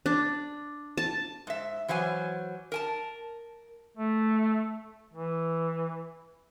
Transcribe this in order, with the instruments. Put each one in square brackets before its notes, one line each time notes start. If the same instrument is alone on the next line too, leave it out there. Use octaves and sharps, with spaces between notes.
[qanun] D4
A5
[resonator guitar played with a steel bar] G#2 E5
E3 F#3 C5 F5 G#5
A#4 G#5 A5
[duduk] A3
E3